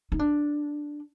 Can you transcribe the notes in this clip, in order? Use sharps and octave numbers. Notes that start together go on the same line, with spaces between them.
D#4
D4